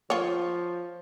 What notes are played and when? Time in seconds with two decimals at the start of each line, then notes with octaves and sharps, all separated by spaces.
0.10 F3 F4 C#5